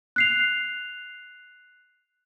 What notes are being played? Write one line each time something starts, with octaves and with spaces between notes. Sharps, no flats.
F#6 C7 F7